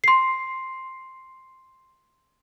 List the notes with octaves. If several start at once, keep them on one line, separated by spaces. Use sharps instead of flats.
C6 C7